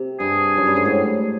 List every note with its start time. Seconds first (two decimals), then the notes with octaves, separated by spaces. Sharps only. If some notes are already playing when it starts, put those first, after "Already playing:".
Already playing: C3
0.20 G2 G#4
0.57 F#2
0.67 G2
0.77 G#2
0.85 A2